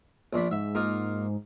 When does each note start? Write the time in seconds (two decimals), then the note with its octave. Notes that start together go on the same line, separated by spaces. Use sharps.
0.33 A#1 A#2 B5
0.51 G#2 E5
0.75 A#3 D#4 F4